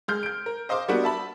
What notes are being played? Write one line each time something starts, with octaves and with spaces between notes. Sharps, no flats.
G#3 F6 G6
G6 D7
A#4
C5 D#5 F5 C6 D6
G3 A#3 B3 D4 F#4
E5 A5 B5